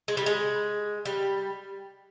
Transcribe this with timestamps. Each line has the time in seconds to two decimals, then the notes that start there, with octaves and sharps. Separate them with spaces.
0.08 G#3
0.17 G3
0.26 G#3
1.05 G3